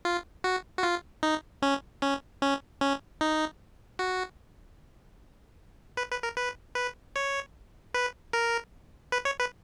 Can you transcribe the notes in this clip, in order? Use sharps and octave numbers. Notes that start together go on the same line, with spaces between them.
F4
F#4
F#4
F4
D#4
C#4
C#4
C#4
C#4
D#4
F#4
B4
B4
A#4
B4
B4
C#5
B4
A#4
B4
C#5
B4